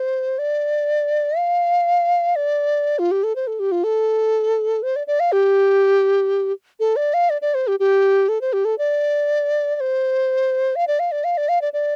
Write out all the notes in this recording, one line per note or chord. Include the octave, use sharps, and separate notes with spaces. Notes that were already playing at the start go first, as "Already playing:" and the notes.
Already playing: C5
D5
F5
D5
F4
G4
A4
C5
A4
G4
F4
A4
C5
D5
D5
F5
G4
A4
D5
F5
D5
D5
C5
G4
G4
A4
C5
G4
A4
D5
D5
C5
F5
D5
F5
D5
F5
D5
F5
D5
D5